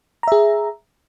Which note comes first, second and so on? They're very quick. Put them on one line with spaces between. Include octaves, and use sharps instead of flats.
A#5 E5 G#4